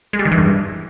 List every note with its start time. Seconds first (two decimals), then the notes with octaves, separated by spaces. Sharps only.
0.13 G#3
0.19 G3
0.25 D#3
0.32 E3
0.38 G2